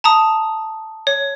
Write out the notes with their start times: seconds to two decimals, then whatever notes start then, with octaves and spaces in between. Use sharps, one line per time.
0.04 A5 A#5 D#6
1.07 C#5